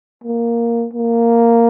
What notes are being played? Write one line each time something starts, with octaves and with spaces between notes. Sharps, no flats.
A#3
A#3